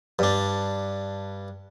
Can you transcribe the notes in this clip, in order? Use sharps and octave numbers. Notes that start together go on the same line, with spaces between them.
G2 D4